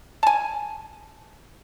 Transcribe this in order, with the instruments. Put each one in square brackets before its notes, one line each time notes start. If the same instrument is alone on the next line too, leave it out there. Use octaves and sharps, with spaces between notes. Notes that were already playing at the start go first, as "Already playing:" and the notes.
[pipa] G#5 A5